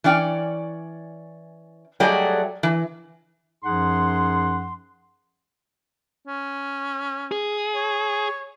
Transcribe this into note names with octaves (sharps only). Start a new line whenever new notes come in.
E3 C#4 D5 G5
F#3 G3 A3 G#4 D5 D#5
E3
F#2 F3 D#4 G#4 F#5 C6
C#4
G#4
C#5